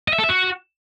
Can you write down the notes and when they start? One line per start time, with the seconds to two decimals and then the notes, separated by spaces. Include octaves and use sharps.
0.08 D#5
0.13 E5
0.18 A4
0.24 E5
0.29 F#4